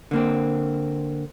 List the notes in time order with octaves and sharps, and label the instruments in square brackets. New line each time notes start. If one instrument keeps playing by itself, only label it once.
[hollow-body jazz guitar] D3 A#3 C4